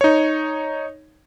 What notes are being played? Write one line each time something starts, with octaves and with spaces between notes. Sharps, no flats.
D#4 C#5